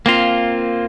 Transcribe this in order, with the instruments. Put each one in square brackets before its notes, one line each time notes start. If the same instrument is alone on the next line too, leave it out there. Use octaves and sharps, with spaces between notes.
[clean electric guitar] A#3 C4 F4